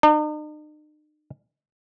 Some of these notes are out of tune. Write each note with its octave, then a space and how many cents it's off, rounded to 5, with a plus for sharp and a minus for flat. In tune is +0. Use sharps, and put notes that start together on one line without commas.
D#4 -45